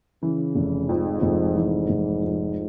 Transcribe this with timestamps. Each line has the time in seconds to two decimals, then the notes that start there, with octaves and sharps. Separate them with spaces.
0.23 C#3 E3
0.55 F1
0.89 F2 G#2
1.22 F1
1.55 E3
1.89 F1
2.23 F2